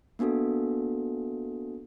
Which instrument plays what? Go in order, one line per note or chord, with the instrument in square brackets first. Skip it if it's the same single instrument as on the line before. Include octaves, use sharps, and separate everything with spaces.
[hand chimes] A#3 B3 D4 F#4 A4